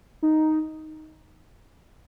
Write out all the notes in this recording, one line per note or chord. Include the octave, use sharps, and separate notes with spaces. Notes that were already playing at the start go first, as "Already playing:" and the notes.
D#4